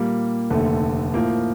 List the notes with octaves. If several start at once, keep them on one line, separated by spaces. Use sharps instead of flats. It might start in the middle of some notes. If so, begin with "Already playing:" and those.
Already playing: A#2 G3 A#3
F1 D#2 D3 A3
A2 F3 A#3